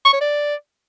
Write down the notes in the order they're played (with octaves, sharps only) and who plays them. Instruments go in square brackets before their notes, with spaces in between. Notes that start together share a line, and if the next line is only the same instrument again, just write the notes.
[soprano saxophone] C#6
C#5
D5